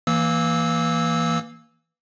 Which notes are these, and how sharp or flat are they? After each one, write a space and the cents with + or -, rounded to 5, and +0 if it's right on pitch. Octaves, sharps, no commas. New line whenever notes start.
E3 +0 A#3 +0 E6 -20